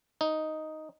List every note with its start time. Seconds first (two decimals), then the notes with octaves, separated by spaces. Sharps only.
0.21 D#4